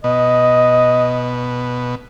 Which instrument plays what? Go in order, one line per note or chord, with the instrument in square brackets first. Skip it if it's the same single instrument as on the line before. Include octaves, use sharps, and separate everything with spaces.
[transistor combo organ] B2 [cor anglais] D#5